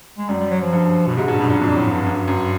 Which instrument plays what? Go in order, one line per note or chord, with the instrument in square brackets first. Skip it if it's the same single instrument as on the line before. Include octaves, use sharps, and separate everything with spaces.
[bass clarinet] G#3
[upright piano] F#2 [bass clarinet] G3
[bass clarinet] G3
F#3
F3
[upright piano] G2
[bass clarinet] B2
[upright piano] G#2 [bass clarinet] C3
[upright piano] G2 [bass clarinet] B2
[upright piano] F#2 [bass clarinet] B2
[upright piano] G2 [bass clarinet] A#2
[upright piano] F2 [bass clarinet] A#2
[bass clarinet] A2
G2
[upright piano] F#2
F#2